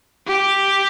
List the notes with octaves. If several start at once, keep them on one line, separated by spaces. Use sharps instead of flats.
G4